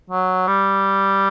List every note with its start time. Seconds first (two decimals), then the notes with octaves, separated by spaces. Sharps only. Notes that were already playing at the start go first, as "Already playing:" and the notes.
0.10 F#3
0.47 G3